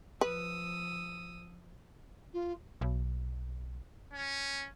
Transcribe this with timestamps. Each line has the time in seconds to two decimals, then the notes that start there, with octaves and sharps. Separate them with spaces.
0.21 F3 B4 D#6 E6
2.33 F4
2.81 B1
4.13 C#4